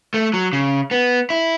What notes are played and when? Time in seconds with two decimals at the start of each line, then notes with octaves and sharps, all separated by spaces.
0.14 A3
0.34 F#3
0.53 C#3
0.91 B3
1.30 E4